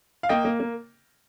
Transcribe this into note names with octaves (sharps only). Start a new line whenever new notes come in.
F5
A#3 D#5 G5
A#3
A#3